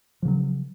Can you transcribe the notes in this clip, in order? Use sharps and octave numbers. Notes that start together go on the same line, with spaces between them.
C#3 F3 F#3